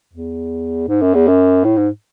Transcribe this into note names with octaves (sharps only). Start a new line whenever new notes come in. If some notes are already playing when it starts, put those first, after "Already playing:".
E2
G#2
F#2
E2
F#2
A2
G#2